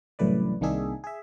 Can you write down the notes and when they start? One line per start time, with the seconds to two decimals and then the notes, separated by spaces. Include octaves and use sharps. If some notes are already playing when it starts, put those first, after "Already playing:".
0.19 C2 F#2 A2 E3 B4 D5
0.61 C2 D#3 A#3 D4 G#4 E5
1.04 G#4 E5